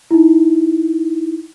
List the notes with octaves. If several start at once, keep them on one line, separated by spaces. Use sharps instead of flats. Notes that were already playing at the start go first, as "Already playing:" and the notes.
D#4 E4